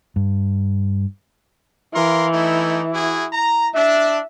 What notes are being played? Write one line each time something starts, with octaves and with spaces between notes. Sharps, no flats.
G2
E3 A#4 F5 C6
A3 D#4 E4
E4 F#4 G#4
A#5
D4 E5